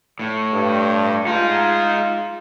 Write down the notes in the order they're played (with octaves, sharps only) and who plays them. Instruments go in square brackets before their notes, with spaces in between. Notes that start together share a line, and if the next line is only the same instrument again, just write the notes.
[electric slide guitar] A2
[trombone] G2
[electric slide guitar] G#3 D#4 [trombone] F4